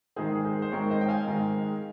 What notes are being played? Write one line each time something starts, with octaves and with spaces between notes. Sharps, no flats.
G#2 D#3 G#3 C4 G#4 C5
G#4 C5
C5
G#2 D#3 G#3 C4 A#4 C#5
C5 D#5
G5
F5 G#5
G#2 D#3 G#3 C4